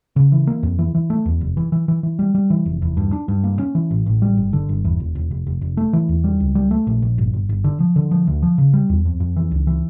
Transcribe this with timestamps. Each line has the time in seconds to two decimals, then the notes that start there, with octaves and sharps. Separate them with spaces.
0.16 C#3
0.32 E3
0.47 A#3
0.63 F2
0.79 E3
0.95 E3
1.10 A3
1.26 E2
1.41 F1
1.57 E3
1.72 E3
1.88 E3
2.03 E3
2.19 G3
2.35 G3
2.50 E3
2.66 F1
2.82 E2
2.97 G2
3.13 D4
3.28 G2
3.44 A#3
3.59 C#4
3.75 E3
3.91 A1
4.06 A1
4.22 G3
4.37 G1
4.53 D3
4.69 G1
4.85 E2
5.00 E1
5.15 E1
5.31 F1
5.47 F1
5.61 F1
5.77 A3
5.93 E3
6.09 E2
6.24 G3
6.40 C#2
6.55 G3
6.71 A3
6.87 A#1
7.02 A#1
7.18 G1
7.33 G1
7.49 G1
7.64 D3
7.80 F3
7.96 D3
8.11 F3
8.27 D2
8.42 F3
8.58 C#3
8.73 G3
8.89 E2
9.05 F2
9.20 F2
9.36 E3
9.51 C#2
9.67 E3